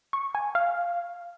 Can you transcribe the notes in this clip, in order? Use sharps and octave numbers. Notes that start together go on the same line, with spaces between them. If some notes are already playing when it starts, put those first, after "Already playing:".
C#6
G#5
F5